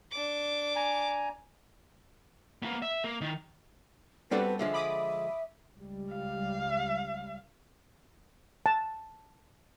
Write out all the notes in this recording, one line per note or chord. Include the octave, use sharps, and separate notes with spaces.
D4 D6
G#5 A#5
A#3 B3
E5
A#3
D#3
G3 B3 C4 D4 F#4 A4 B4
D3 F3 G#3 E5
B5 D6 D#6
C#2 G3
F5
A5